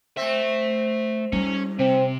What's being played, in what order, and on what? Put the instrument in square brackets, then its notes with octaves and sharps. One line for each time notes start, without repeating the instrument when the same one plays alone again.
[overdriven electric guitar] A3 E5 [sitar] C4
[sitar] G#2 [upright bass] G3 [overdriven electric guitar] C#4
[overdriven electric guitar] C3 [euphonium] C4